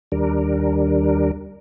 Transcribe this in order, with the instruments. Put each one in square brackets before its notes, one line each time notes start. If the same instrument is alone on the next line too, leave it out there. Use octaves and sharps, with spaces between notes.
[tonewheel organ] D#2 G3 D4 A#4